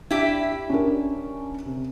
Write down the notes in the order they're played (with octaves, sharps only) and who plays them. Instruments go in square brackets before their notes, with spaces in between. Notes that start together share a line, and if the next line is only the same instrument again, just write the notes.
[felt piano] D4 [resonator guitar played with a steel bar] E4 G4
[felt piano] C#4 D4 A#4
C3